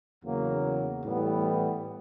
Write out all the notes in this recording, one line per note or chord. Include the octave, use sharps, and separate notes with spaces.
E2 C#3 F#3 A#3
A2 E3 G3 B3